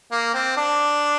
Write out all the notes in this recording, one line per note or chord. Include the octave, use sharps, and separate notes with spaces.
A#3
C4
D4